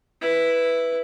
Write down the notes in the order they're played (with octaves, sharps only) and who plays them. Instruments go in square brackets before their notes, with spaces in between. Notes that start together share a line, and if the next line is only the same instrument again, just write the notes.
[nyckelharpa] E4 B4